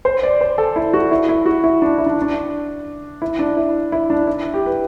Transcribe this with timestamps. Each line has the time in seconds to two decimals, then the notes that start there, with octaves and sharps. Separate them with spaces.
0.05 C5
0.23 D5
0.41 C5
0.58 A4
0.76 E4
0.93 F#4
1.11 E4
1.29 E4
1.46 F#4
1.64 E4
1.82 D4
1.98 E4
2.06 D4
2.22 D4
3.22 E4
3.39 D4
3.57 E4
3.92 E4
4.10 D4
4.27 E4
4.54 G4
4.66 B4